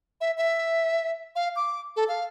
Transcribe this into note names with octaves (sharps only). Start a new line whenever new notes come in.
E5
E5
F5
D6
A4
F5